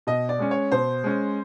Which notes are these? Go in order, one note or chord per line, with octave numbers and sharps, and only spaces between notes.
B2 D#5
D5
G#3 C#4
C#5
B2 C5
G#3 C#4